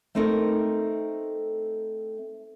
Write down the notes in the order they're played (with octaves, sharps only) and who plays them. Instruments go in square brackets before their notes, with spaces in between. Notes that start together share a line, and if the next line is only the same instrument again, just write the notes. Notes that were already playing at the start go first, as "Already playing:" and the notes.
[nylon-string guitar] A3 C4 D#4 A4 A#4